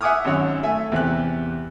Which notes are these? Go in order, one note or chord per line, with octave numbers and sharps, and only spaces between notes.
E5 F#5 G#5 D6 D#6 F6
G#1 F#2 C#5 F#5
A3 E5 G#5
E2 C3 G4 F#6